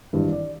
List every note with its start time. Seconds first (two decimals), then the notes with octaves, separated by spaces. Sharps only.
0.13 G#1 G2 E3
0.32 D5